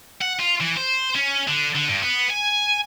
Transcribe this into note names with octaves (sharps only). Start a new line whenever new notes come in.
F#5
F4
E3
C5
C#4
D3
D3
G2
B3
G#5